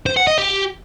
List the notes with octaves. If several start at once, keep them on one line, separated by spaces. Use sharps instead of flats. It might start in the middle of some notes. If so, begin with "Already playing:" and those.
C5
F#5
D#5
G4